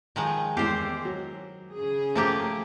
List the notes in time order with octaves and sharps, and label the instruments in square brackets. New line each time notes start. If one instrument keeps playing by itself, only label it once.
[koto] D#3 F3 G#3 [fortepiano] A#5
[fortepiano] E2 G#3 [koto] G4 C5
[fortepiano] F#3
[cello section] C#3 G#4
[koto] F3 A#3 G4 [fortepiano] A3 C5